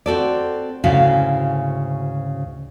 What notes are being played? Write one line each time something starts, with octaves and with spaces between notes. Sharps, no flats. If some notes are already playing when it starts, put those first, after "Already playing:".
C4 F#4 A4 D5
D2 G#2 C#3 E4 F#4 F5